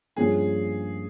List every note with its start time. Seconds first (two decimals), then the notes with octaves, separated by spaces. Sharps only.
0.16 G2 F3 A#3 C#4 F4 G#4